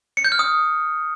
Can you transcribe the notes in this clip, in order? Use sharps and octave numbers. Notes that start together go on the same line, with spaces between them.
C#7
G6
F6
D#6